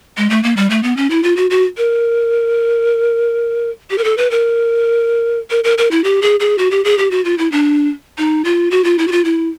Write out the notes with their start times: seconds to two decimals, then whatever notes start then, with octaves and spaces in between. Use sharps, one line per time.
0.17 G#3
0.30 A3
0.43 A#3
0.57 G3
0.70 A3
0.83 B3
0.97 C#4
1.10 E4
1.23 F4
1.37 F#4
1.51 F#4
1.78 A#4
3.91 G4
3.98 A#4
4.04 A4
4.18 B4
4.31 A#4
5.50 A#4
5.64 A#4
5.78 A#4
5.91 E4
6.04 G4
6.22 G#4
6.40 G#4
6.58 F#4
6.71 G4
6.85 G#4
6.98 G4
7.11 F#4
7.25 F4
7.38 E4
7.52 D4
8.18 D#4
8.45 F4
8.71 F#4
8.84 F4
8.99 E4
9.08 F#4
9.12 F4
9.25 E4